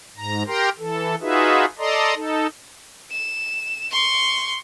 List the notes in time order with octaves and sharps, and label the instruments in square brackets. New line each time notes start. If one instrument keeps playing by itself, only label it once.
[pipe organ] G#2 A#5
G4 A#4 G5 A#5 C6
E3 A4
D#4 F4 F#4 G#4 B4 E5
A4 D5 D#5 A#5 C6
D#4 A4
[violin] E7
C6 C#6